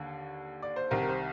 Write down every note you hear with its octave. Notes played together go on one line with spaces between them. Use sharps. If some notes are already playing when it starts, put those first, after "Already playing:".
Already playing: D#2 D3
D5
C5
C2 C3 D#3 A#4
A#4
C5